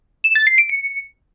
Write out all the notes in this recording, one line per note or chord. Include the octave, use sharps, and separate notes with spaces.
E7
A6
C7
D7
C#7